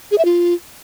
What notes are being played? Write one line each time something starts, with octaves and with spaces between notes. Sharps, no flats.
G#4
E5
F4